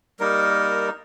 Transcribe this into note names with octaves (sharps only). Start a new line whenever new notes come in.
G3 A#3 D#4 A#4